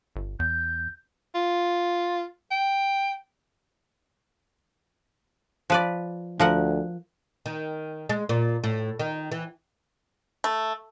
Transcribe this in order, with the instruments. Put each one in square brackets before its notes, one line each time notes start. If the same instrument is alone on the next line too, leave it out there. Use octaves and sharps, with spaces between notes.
[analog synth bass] G1
[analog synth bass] E2 [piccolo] G6
[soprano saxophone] F4
G5
[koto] F3 B4 D5
[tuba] D2 [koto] F3 A#4 F#5
[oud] D#3
G#3
A#2
A2
D#3
E3
[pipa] A3